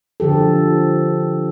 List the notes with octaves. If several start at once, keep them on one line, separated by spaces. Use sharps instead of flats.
D3 F3 G4 A4